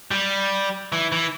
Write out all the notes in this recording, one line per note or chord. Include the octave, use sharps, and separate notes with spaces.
G3
E3
E3